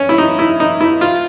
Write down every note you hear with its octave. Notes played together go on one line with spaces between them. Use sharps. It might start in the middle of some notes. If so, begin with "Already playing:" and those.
Already playing: C#4
E4
D#4
E4
D#4
E4
F4